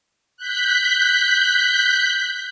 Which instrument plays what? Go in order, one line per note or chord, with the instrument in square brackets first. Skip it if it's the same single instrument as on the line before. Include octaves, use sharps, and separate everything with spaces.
[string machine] F#6 G6 B6